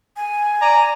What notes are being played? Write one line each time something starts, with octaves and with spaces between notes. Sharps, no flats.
G#5
D5 A#5